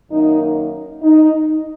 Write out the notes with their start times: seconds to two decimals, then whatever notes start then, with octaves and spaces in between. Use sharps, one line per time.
0.11 F#2 D#3 A#3 D#4
1.03 D#4